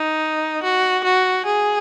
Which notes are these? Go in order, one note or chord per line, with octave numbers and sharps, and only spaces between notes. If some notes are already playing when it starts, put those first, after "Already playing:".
Already playing: D#4
F#4
F#4
G#4